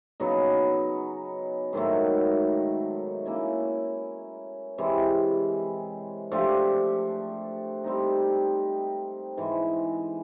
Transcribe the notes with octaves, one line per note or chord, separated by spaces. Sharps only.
C#3 F#3 B3 D#4
G#2 D#3 F#3 A3
A#3 C#4 E4
C3 E3 G#3
F3 A3 D4 G4
G3 C4 D#4
G#2 E3 G#3